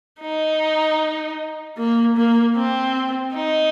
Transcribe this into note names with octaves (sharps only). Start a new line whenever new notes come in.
D#4
A#3
A#3
C4
D#4